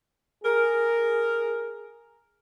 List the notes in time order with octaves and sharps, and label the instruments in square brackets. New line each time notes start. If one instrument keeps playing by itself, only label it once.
[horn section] G#4 A#4